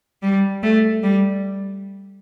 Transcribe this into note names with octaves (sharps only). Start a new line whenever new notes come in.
G3
A3
G3